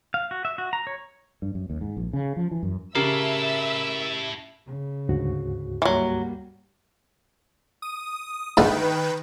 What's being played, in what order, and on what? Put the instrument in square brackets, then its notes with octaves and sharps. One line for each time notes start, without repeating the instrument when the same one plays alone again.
[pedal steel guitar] F5
F#4
E5
F#4
A#5
C#5
[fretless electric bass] G2
F#2
D#2
G#2
A#1
C#3
F3
E3
F#2
[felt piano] C#3 G4 C7 [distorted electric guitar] E4 A4 [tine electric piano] A#4 [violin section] E5 E6
[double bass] C#3
[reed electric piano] D2 G#2 F#4
[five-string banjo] E3 F#3 [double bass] G3 A#3
[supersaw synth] D#6
[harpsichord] D2 G#2 D5 [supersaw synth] D#3 B4 G5